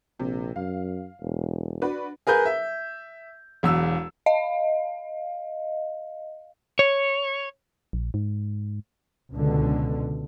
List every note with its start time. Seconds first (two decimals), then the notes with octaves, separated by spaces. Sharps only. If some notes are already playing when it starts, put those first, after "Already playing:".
0.20 A#1 C3
0.56 F#2 F5
1.21 E1
1.82 D4 F#4 B4
2.27 G#4 A#4 B4 G6
2.45 E5
3.63 E1 E2 E6
4.26 D#5 F5
6.79 C#5
7.93 A#1
8.14 G#2
9.32 C#2 B2 D3